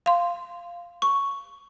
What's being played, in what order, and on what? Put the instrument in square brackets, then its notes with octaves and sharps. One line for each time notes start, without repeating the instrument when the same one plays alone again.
[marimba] F5 C6
[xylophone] C#6